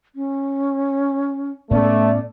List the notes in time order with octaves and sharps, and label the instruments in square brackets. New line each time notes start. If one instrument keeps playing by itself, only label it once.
[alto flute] C#4
[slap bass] A2 B3 C#4 [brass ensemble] A3 [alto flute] D5